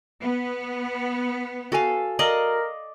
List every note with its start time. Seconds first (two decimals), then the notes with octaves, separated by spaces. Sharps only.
0.21 B3
1.72 F#4 A4 F5 G#5
2.19 A#4 D5 D#5 F5